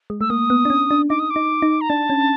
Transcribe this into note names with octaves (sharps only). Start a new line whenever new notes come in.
G#3
A3 E6
A#3 D#6
B3
D4
C#4
D4
D#4 D6
D#6
D6
D#4
D#4
A#5
D4 A5
C#4